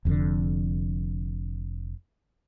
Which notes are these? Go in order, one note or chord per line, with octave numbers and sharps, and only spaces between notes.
F1 F2 A2 D3